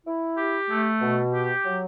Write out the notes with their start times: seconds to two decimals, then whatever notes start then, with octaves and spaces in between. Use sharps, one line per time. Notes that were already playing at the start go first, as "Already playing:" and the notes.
0.05 E4
0.37 G4
0.69 A3
1.01 B2
1.33 G4
1.65 F#3